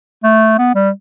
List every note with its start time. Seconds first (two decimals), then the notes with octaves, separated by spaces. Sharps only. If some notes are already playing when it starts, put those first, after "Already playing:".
0.24 A3
0.58 B3
0.75 G3